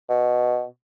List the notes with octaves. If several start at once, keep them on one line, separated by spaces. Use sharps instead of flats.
B2